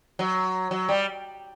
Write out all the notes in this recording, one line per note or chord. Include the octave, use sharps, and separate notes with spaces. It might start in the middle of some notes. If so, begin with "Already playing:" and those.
F#3
F#3
G3